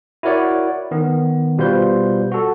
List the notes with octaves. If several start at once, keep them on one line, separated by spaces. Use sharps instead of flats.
E4 F#4 A#4 C#5 D5 F#5
D#3 B3
B2 G3 F4 B4 C5 G6
F#4 A4